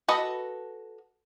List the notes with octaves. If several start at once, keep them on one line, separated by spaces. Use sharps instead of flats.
F#4 A4 B4 D#5